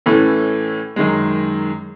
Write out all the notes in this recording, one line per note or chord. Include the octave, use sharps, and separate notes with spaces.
A2 E3 A3 C#4
F#2 D#3 G#3